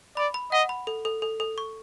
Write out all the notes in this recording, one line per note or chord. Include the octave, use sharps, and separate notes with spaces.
D5 B5
B5
D#5 F#5
B5
A4
A4
A4
A4
C#6